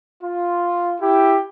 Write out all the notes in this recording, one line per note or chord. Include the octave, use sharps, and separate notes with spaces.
F4
E4 G4